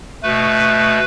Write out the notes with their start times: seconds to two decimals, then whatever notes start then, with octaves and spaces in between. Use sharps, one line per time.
0.23 B2 A3 B4